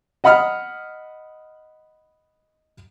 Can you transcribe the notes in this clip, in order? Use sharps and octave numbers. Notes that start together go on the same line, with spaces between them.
D#5 F#5 B5 D#6 F6